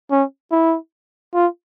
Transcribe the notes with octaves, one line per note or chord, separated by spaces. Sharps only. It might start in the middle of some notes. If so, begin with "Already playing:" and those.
C#4
E4
F4